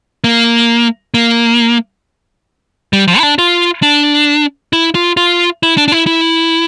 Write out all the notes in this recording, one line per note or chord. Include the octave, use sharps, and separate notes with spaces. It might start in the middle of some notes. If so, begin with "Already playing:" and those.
A#3
A#3
G3
F3
E4
D4
F4
D4
E4
F4
F4
E4
D4
D4
E4
E4